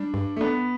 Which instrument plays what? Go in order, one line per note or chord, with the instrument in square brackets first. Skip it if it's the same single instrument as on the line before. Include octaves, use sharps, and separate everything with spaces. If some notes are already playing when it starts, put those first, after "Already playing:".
Already playing: [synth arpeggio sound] G3 [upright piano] D4
[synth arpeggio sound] G2
[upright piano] A3
[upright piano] B3 [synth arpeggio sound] D4